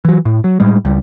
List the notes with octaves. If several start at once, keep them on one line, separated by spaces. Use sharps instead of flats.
E3 F#3
A2
F#3
A2 G3 G#3
C#2 G3